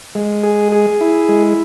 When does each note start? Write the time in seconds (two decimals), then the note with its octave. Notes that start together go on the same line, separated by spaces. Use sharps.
0.15 G#3
0.43 G#4
0.72 G#4
1.01 E4
1.29 G#3